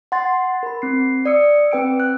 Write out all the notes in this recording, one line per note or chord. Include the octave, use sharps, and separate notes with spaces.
F#5 C6 A6
A#4 B5
C4 C7
D5 D#6 E6 C#7
C4 B4 G5 E6 D7
F#6